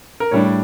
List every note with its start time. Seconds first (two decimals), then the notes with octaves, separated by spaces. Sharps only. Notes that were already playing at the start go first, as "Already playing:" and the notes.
0.20 A#4
0.31 A2 G3 D4 C#5